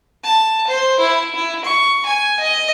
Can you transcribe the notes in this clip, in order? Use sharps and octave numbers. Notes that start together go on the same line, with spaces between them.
A5
C5
E4
E4
C#6
G#5
D#5